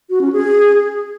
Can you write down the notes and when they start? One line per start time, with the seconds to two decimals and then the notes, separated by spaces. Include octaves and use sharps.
0.10 F#4
0.21 C#4
0.33 G#4